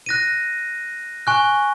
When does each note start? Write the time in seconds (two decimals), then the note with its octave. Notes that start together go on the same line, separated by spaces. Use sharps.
0.06 F#6 A#6 D#7
1.27 G#5 C#6 F#6